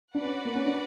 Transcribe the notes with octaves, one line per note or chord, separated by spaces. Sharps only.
D4 F#4 B4 D5 F#5
C#4
A#3
C#4
D4